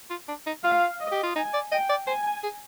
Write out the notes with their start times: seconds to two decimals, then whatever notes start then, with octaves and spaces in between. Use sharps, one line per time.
0.10 F4
0.28 D4
0.47 D#4
0.64 F4 F5
1.00 D#5
1.12 G4
1.23 F4
1.36 D#4 G#5
1.54 D5
1.71 D#5 G5
1.89 D5
2.07 C5 G#5
2.43 G#4